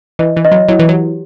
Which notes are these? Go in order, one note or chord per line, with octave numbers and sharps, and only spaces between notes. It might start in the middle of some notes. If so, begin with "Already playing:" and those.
E3 D#5
E3
D#5
F#3
F#3 E4
E3
F#3
G4